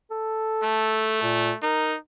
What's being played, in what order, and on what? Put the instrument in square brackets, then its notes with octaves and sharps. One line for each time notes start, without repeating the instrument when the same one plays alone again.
[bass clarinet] A4
[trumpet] A3
[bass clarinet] A#2
[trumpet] D#4 [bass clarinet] A#4